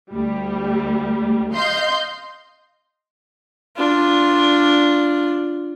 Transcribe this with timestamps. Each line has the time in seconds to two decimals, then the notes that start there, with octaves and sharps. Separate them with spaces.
0.10 D2 G3
1.53 D#5 F5 C6 G6
3.77 D4 F4